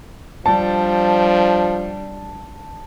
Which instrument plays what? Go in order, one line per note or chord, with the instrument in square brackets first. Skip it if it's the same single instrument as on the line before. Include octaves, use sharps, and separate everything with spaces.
[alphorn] F3 [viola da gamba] G3 D4 [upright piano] A5